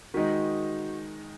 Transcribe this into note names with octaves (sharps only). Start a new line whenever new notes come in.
D#3 G#3 D#4 F#4